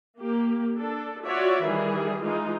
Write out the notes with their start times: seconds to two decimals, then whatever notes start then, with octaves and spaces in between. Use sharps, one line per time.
0.19 A#3 G4
0.76 D4 A4
1.25 F4 F#4 C#5 D5 E5
1.64 D#3 E3 G3 G#4
2.22 E3 G#3 D#4 F4